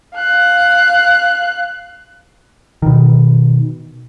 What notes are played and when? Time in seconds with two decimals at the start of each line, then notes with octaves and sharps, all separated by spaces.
0.15 F5 F#6
2.82 B2 D#3